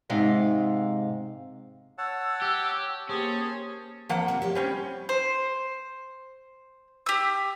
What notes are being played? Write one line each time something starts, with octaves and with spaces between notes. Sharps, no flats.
G#2 C3 F5
C#5 F#5 A5 E6
G4
A#3 C#4 G4 G#4 C5 A5 D#6
F2 F3 A#3 F#5 G5
C3 D#3 A3
G4 C#5 D5
G3 C4 C#4
C5
G4 E6